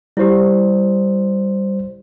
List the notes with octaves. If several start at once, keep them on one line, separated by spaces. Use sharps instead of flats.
G3 E4 G4 C5